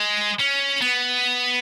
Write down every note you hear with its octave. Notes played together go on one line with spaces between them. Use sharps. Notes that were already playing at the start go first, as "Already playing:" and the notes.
Already playing: G#3
C#4
B3